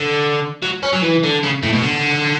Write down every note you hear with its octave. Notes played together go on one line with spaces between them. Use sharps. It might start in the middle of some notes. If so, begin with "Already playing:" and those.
Already playing: D3
F#3
C#4
F#3
E3
D3
C#3
A2
B2
D3